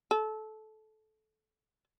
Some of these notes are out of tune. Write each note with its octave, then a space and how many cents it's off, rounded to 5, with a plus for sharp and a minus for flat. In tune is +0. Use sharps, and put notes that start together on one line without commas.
A4 -20